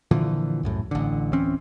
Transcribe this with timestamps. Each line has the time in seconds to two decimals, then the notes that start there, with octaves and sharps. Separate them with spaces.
0.11 A#2 D3 E3 F3
0.63 C2 F#2 A2
0.91 A1 D3
1.33 D1 E3 C4 C#4